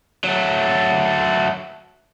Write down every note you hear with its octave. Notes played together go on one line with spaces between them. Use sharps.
F#3 A3